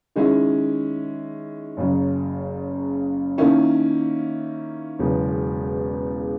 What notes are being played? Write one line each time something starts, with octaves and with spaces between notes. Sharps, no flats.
D#3 G#3 C#4 E4
F#1 F#2 C#3 F#3
D#3 A#3 C#4 E4
E1 E2 C#3 F#3